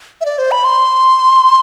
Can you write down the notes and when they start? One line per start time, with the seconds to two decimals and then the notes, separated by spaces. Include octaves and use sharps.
0.21 E5
0.25 D5
0.38 C5
0.51 B5
0.64 C6